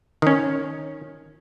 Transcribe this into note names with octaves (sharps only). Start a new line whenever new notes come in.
D#3 C#4